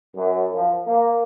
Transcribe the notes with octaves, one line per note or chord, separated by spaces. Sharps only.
F#2
F3
A#3